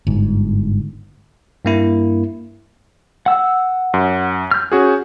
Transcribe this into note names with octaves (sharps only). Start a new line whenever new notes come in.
G1 G#2
G2 A#3 E4
F#5 E6
F#2
F6 G6
C#4 F#4 G#4